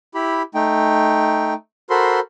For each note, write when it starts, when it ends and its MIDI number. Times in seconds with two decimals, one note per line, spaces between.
0.15 0.42 64
0.15 0.42 67
0.15 0.42 83
0.55 1.54 57
0.55 1.54 63
0.55 1.54 79
1.90 2.20 66
1.90 2.20 69
1.90 2.20 70
1.90 2.20 72
1.90 2.20 83
1.90 2.20 84